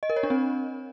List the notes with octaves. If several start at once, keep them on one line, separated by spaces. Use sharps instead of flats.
D#5
A#4
C#5
D4
C4